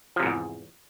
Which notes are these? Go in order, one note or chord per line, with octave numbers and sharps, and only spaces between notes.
E2 G#2 C3 F3